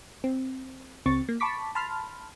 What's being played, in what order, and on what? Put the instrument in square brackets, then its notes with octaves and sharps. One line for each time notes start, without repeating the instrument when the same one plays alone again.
[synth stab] C4
C#2 C4 C#6 A6
A#3
A5 B5 C#6 D6 B6
A5 B5 C6 F6